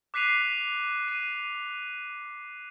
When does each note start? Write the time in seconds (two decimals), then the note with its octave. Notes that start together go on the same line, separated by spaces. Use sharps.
0.14 D6 F#6 B6 C7 D#7 F7
1.08 D#7